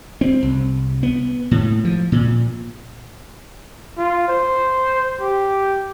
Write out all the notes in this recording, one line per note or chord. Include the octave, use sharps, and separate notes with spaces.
C4
C2
B3
A2
F3
A#2
F4
C5
G4